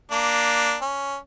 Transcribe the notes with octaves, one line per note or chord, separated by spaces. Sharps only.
A#3 D4
C#4